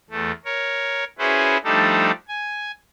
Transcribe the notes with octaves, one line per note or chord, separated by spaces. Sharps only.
E2 A3
A#4 C#5
C#4 E4 F#4 G#4 B4 C5
F3 G3 A3 D4 D#4 A4
G#5